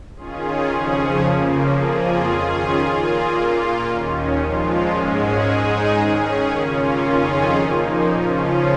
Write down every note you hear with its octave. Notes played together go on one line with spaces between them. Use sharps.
D#3 C#4 F4 G#4
F2 C#3 F3 C#4 G#4
C#3 F3 A#3
F2 F3 A#3 F4 G#4
D#3 C#4 F4 G#4
A#2 A#3 F4 G#4
A#2 A#3 F4
D#2 D#3 C#4
A#2 F3 G#3 F4
G#2 G#3 C#4 G#4
G#2 G#3 D#4 G#4
D#3 C#4 G#4
C#3 A#3 C#4 F4
F2 D#3 C#4 F4 G#4
A#2 F3 A#3 D#4
C#3 F3 C#4 F4